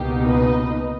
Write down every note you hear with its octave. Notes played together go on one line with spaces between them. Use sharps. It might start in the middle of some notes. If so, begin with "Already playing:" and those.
Already playing: C#2 B2 A#3 D#4 G4
B4 D#5